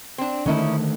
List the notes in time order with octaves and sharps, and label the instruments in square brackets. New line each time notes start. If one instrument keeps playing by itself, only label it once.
[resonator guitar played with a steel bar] C4 D4
[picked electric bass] D3 D#3 A3 [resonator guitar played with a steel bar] C#4 D#4 E4